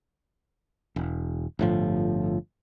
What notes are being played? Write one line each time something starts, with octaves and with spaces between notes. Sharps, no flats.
E1
G1 A2 F3